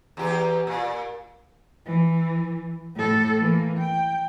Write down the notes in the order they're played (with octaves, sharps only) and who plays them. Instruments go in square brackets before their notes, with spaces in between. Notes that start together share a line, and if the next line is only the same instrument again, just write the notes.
[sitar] E2 G4
A#2
[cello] E3
A2 A4
E3 A#3
G5